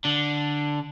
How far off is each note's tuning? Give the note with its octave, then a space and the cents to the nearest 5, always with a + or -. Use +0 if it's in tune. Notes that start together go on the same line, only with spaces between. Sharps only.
D3 +0 D4 +0